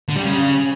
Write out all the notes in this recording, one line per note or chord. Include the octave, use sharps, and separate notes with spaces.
D3
G3
C#3